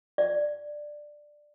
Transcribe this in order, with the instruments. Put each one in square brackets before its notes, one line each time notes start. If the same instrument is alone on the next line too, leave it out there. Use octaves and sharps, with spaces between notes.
[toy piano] D5